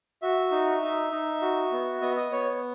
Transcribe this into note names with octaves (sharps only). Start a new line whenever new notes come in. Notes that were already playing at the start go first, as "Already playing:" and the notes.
F#4 E5
D#4
D#4
D#4
F#4
B3
B3 D#5
D#5
B3 C#5